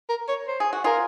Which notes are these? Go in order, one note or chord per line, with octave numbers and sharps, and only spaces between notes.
A#4
C#5
C5
G#4
F#4
F4 G#4 A#4